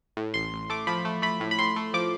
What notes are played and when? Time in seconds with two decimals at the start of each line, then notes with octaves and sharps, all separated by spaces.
0.17 A2
0.34 A1 C6
0.53 A1
0.70 A3 D6
0.87 F3 B5
1.05 A3
1.22 A3 B5
1.40 A2
1.51 B5
1.59 A2 C6
1.76 A3
1.94 F3 D6